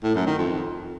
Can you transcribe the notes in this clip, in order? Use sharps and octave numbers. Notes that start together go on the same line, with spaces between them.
A2
F#2
D#3
F2